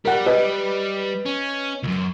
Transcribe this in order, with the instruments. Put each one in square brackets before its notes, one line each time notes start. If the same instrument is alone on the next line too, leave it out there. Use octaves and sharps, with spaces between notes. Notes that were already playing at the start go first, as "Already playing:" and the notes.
[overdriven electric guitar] G3 [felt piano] A#4 F#5
[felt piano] B4 D#5
[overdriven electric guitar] C#4
C#2 F#2